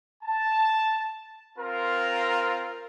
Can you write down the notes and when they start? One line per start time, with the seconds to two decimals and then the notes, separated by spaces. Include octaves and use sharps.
0.24 A5
1.58 C4 F4 A#4